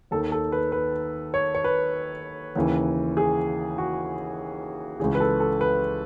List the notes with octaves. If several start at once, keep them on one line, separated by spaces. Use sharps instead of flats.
D#2 D#3 A4
A4
B4
B4
C#5
C#5
B4
D#2 C#3 E3
G#4
F#4
C#2 C#3 E3 G#4
B4
A4
A4
B4